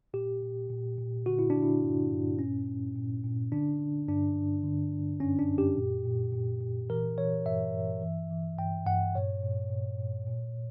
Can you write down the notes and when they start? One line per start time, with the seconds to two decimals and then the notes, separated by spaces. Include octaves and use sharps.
0.13 A#2 G4
0.42 A#2
0.70 A#2
0.98 A#2
1.26 D3 F#4
1.39 E4
1.50 D3 D4
1.62 E4
1.83 G2
2.11 G2
2.38 A#2 C#4
2.67 A#2
2.96 A#2
3.24 A#2
3.52 D3 D4
3.80 D3
4.08 G2 D4
4.36 G2
4.64 D3
4.92 D3
5.20 F#2 C#4
5.39 D4
5.49 F#2
5.58 G4
5.77 A#2
6.05 A#2
6.33 A#2
6.61 A#2
6.89 E3 A#4
7.18 E3 C#5
7.46 G2 E5
7.74 G2
8.02 E3
8.31 E3
8.58 G2 G5
8.86 G2 F#5
9.14 A#2 C#5
9.43 A#2
9.70 A#2
9.99 A#2
10.27 A#2